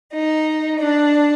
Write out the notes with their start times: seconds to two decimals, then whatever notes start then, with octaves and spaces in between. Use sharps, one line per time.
0.13 D#4
0.79 D4